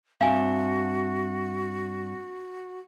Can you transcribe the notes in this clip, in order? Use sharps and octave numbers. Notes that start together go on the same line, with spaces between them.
G2 C4 F#4 E5 F5 G#5